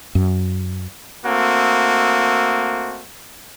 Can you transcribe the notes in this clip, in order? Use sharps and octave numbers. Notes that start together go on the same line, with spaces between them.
F#2
A3 A#3 C4 F#4